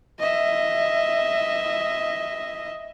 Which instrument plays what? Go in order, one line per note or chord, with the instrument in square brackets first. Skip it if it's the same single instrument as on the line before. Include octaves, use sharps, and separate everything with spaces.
[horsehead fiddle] D#5 E5